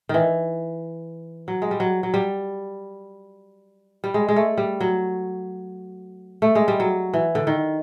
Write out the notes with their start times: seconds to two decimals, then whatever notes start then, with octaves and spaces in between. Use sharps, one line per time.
0.09 D#3 E3
1.48 F#3
1.62 G#3
1.71 G3
1.80 F#3
2.03 F#3
2.14 G3
4.04 G3
4.14 G#3
4.29 G#3
4.36 A3
4.58 G3
4.80 F#3
6.42 A3
6.55 G#3
6.68 G3
6.80 F#3
7.14 E3
7.35 D3
7.47 D#3